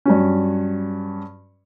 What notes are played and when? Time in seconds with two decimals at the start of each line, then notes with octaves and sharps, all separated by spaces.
0.06 G2 F#3 C#4